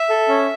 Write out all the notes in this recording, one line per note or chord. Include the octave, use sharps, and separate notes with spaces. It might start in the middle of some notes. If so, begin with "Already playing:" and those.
Already playing: E5
A4
C#4